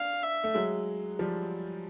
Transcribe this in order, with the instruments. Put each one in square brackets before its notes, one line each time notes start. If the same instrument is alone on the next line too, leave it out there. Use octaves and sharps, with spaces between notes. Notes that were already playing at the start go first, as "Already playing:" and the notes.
Already playing: [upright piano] D4 [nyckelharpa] F5
[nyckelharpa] E5
[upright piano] A3
F#3 G#3
F3 G3